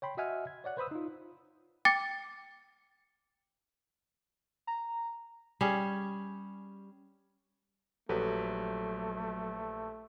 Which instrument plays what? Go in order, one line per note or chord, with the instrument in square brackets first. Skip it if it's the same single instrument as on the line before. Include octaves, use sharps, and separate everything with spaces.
[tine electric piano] C#5 G5 B5 C6
F#4 D#5 E5 F#5 G#5 F6
G#6
C#5 D5 F#5 F#6
B4 C5 B5 D#6 E6
D#4 F4
[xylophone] G5 D6 A6 C#7
[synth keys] A#5
[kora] G3 C#4 G#4
[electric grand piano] A#1 G4 B4 [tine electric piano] F#3 [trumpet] A3 [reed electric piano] A4